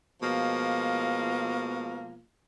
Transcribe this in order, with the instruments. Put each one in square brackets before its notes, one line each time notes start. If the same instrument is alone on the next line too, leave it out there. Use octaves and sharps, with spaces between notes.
[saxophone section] B2 F3 G#3 A#3 F4